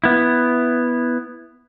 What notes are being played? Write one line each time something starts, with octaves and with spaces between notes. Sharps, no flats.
B3 E4